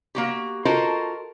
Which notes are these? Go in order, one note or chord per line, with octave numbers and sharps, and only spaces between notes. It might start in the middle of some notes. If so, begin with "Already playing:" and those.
A#3 F#4 G4
F4 F#4 A4 A#4 C5 D#5